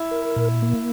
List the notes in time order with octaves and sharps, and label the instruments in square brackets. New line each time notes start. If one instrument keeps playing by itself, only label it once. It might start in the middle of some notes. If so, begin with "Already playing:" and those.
Already playing: [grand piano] E4
[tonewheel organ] A#4
A#2
A#3